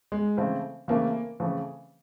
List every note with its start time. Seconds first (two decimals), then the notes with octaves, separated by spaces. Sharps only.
0.12 G#3
0.37 C#3 E3 A3 C4 E4
0.88 C#3 E3 A3 A#3 C4 E4
1.40 C#3 E3 A3 C4 E4